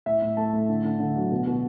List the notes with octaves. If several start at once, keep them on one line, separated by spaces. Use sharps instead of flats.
A2 E5
A2
A3 A5
A2
D3
D3
D3
F#3
B2
B2